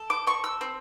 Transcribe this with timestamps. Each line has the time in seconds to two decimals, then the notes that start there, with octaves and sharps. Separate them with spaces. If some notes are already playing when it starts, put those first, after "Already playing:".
Already playing: A4
0.10 D6
0.27 C4 C#6
0.44 E6
0.61 C4